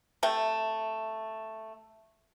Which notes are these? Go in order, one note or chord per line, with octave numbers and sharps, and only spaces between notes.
C3 A3 G5